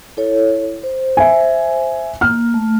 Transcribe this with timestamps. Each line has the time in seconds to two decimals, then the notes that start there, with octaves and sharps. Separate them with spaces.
0.17 E4 A4 C#5
0.83 C5
1.17 E5 G#5
2.21 A#3 F6
2.54 A3